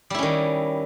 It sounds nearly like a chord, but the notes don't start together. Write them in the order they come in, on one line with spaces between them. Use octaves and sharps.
G3 E4 C#4 D#3